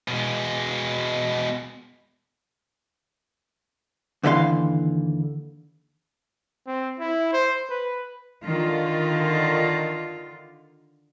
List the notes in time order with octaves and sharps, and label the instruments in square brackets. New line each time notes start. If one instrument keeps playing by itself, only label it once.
[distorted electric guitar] B2 G#3
[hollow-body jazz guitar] D#2 D3 E3 E5 F5 C6
[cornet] C4
E4
C5
B4
[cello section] D3 D#3 F4